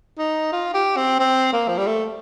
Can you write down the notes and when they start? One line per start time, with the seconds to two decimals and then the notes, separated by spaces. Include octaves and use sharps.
0.18 D#4
0.53 F4
0.74 G4
0.97 C4
1.19 C4
1.53 A#3
1.68 F3
1.78 G3
1.86 A3